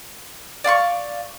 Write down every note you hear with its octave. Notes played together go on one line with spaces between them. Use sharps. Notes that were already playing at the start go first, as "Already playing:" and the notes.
D5 F5 C6 C#6